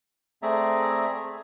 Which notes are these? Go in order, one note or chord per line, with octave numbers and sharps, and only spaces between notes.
A3 C4 G#4 D5 E5 A#5